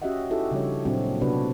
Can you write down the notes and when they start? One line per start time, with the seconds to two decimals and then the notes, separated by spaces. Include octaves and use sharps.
0.02 C#4 F#4 G4 D#5 E5 F#5
0.30 D#4 E4 F#4 G4 A4 E5
0.51 C#3 F3 G3 D4 F#4 C#5
0.85 A#2 F#3 A#3 C4 D4 F#4
1.21 C3 B3 D4 F#4 B4